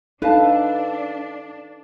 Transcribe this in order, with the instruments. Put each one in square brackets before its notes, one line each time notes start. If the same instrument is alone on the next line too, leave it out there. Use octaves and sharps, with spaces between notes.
[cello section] D4 [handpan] D#4 A4 [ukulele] B4 F5 A5